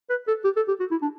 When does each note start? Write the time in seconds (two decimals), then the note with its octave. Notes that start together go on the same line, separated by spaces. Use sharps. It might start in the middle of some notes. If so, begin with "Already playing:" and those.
0.10 B4
0.28 A4
0.44 G4
0.56 A4
0.68 G4
0.80 F#4
0.91 E4
1.02 D4